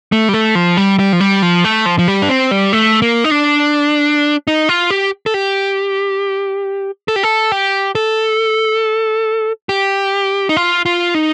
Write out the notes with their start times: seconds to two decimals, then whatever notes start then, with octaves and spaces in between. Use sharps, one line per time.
0.12 A3
0.29 G3
0.34 A3
0.55 F3
0.77 G3
0.99 G3
1.13 F3
1.20 G3
1.42 F3
1.64 A3
1.86 F3
1.99 F3
2.08 G3
2.22 D4
2.29 C4
2.51 G3
2.73 A3
3.02 A#3
3.24 D#4
3.31 D4
4.47 D#4
4.69 F4
4.90 G4
5.26 A4
5.34 G4
7.08 A4
7.16 G4
7.23 A4
7.52 G4
7.95 A4
9.69 G4
10.49 D#4
10.57 F4
10.86 F4
11.14 D#4